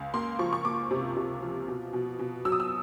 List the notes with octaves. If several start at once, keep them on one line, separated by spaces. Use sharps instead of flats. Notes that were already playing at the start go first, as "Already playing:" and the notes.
Already playing: C#2
A#3 C6
F3 C#6
C#6
A#3 D6
C3
C3
F3
B2
B2
B2
F#3 E6
D#6
E6